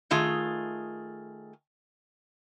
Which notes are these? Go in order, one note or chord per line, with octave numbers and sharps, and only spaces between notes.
D#3 A3 F4 G#4